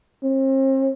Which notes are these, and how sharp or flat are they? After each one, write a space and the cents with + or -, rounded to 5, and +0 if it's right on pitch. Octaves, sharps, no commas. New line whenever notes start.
C4 +40